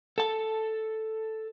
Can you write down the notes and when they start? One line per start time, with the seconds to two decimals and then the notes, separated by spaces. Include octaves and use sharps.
0.18 A4 A5